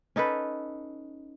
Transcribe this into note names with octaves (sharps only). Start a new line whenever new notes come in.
C#4 D#4 A4 B4